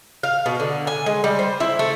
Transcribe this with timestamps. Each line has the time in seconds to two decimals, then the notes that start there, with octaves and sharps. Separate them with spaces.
0.23 F5
0.46 B2
0.60 D3
0.87 G#5
1.06 G#3
1.24 G3
1.39 C5
1.60 E4
1.79 A3